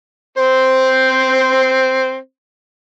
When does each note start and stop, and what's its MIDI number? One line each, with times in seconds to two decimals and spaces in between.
0.38 2.16 60
0.38 2.16 72